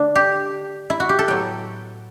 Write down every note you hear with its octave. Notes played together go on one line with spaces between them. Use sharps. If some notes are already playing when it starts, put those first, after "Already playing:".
Already playing: D3 A3 D4
G4
E4
F#4
G4
A4
A2 F#3 B3 G5